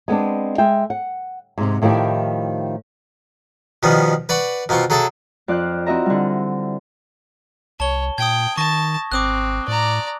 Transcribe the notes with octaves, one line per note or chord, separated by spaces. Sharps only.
G#3 B3 C4 D4
G#3 E5 G5
F#5
G#2 C3
A2 D#3 F3 E4 G4
B2 D#3 F3 G3 B3
B4 D5 F#5 B5 C#6
B2 A#3 C4 F4 C#6
F#3 G#4 A4 E5 A5
F2 D5 F5 F#6 G6
C4 E4 F#4 D#5 E5 A#5
D3 G3
C2 C#5 A5 G7
A#2 G5 D#6 G#6
D#3 A5 C#6 A#6
G#1 C4 D6 D#6 F#6
A2 D5 A#5